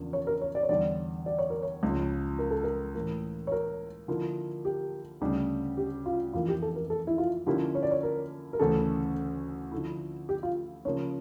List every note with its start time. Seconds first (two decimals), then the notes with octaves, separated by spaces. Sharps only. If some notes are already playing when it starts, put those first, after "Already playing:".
Already playing: E2 C#3 F3 A#3 D4
0.13 C#5
0.27 A#4
0.41 C#5
0.55 D5
0.63 C#5
0.69 E2 D3 G3 D5
1.26 D5
1.39 C#5
1.50 A#4
1.63 C#5
1.83 C#2 C#3 F3
2.39 A#4
2.51 A4
2.63 A#4
2.95 A2 E3 A#3
3.47 C#5
3.52 A#4
4.08 D3 F3 A#3 E4
4.65 G4
5.21 D2 C#3 G3 D4
5.77 G4
6.06 F4
6.33 F2 E3 A#3 E4 F4
6.48 G4
6.62 A4
6.76 A#4
6.90 A4
7.07 E4
7.18 F4
7.46 D3 F3 A#3 C#4 E4 G4
7.75 C#5
7.83 D5
7.91 C#5
8.03 A#4
8.53 A#4
8.60 D2 C#3 E3 A3 C#4 A4
9.72 D3 F3 A3 E4
10.29 G4
10.43 F4
10.85 C#3 F3 A#3 C#5